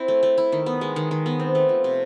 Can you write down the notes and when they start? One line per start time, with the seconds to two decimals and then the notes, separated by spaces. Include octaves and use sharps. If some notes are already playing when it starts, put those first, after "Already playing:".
Already playing: C4 E4
0.08 A3
0.23 A3
0.38 E4
0.52 D#3
0.66 B3
0.81 G#3
0.96 D#3
1.11 D#3
1.26 B3
1.40 C4
1.55 A3
1.69 F3
1.84 C3